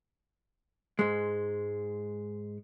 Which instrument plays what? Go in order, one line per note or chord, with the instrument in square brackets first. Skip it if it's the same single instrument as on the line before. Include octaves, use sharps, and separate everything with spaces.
[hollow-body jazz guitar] G#2 G#3